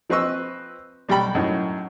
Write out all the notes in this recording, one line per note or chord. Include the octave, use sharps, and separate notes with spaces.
F3 C4 B4 D#5 C#6 E6
B1 G3 G4 G5 B5
F#2 A2 D#4